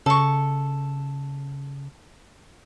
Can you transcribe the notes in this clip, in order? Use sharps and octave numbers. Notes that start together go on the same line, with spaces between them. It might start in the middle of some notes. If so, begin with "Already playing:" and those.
C#3 A4 C#6